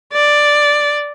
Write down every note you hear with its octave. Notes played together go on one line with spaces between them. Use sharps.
D5